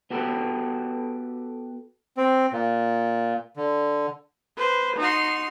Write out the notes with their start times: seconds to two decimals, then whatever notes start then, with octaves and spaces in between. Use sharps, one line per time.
0.10 B3 F#4 G4 A4 B4
2.17 C4
2.53 A#2
3.57 D3
4.57 B4 C5
4.98 D#4 F#4 C6